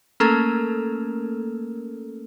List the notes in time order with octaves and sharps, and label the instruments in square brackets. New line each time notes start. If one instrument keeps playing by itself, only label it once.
[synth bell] A3 A#3 C#4 A4 A#4